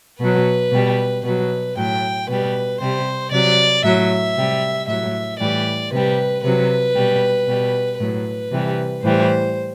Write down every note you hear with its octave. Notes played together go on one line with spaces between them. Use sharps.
B2 F#3 B4
B2 G3
B2 F#3 B4
A2 F#3 G5
B2 G3 B4
C3 G3 C5
C3 F#3 D5
A2 F#3 E5
C3 G3
A2 F#3 E5
A2 E3 G3 D5
C3 G3 B4
C3 F#3 B4
B2 G3
B2 G3
A2 F#3 B4
C3 E3 G3
A2 E3 G3 C5